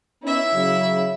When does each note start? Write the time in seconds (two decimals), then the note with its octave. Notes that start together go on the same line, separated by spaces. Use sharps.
0.23 B3 C#4 D#4 E4 E5
0.54 C#3 F#3